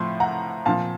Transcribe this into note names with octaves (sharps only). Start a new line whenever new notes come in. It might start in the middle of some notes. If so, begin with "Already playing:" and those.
Already playing: A2 F3 C6
F#5 A#5
A#2 F3 F5 A5